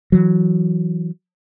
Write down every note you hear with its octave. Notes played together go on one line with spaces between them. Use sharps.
E3 F#3